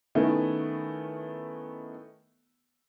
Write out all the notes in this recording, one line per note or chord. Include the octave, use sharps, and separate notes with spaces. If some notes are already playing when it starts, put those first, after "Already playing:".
D#3 A3 B3 C#4 E4